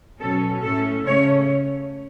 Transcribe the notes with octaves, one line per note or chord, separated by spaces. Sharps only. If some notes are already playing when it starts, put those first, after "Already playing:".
B2 F#3 C#4 A4
A2 A3 C#4 A4
C#3 A3 C#4 C#5